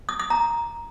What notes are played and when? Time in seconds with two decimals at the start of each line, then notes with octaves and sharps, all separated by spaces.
0.09 D#6
0.19 D#6
0.30 A#5